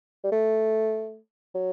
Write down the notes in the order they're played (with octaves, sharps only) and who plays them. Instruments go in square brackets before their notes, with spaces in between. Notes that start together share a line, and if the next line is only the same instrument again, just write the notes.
[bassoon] G3
A3
F#3